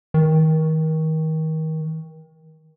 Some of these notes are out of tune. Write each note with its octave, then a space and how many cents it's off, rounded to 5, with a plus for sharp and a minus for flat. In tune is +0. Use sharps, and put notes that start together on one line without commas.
D#3 +30